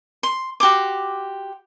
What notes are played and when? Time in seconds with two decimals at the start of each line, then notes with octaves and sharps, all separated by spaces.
0.23 C6
0.60 F#4 G4 C6 D6